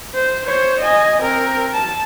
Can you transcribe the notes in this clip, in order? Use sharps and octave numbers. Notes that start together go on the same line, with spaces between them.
C5
C5 C#5
D#5 G#5
C4 A#4
A5